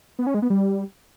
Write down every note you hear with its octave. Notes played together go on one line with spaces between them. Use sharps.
B3
C#4
G#3
B3
G3